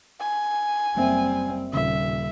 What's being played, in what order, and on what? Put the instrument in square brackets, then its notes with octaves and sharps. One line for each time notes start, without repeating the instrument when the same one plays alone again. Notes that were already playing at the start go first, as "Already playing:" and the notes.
[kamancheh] G#5
[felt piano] F#1 E5 [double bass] G3 C4
[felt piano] D#1 C#3 [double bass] A#2 [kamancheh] E5